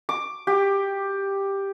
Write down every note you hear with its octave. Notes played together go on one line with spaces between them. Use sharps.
D6
G4